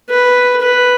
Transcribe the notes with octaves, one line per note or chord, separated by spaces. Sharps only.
B4
B4